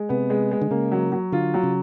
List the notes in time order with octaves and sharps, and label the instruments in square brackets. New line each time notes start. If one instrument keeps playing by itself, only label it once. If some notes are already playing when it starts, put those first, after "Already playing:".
Already playing: [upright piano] G#3
[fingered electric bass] C3 [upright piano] B3
[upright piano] G#3
G#3
[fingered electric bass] D3
[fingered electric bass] C#3 [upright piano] A#3
[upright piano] F#3
F#3
[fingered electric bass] D3 [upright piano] F4
[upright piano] F#3
[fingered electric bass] C#3